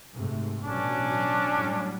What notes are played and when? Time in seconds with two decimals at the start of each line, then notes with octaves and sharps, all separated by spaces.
0.14 G#2 C3 A3
0.65 A1 B2 F#3 C#4 D4
1.54 A2 F#3 G3